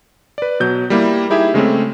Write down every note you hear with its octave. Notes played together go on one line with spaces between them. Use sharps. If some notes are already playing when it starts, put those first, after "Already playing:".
B4 D5
B2 F#3 G6
G3 A#3 E4
D#4 E4 G4 G#4 E5
C#3 G#3 A3 C4 C#4